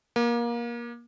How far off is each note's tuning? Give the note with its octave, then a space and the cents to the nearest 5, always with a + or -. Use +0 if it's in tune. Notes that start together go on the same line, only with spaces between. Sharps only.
A#3 +25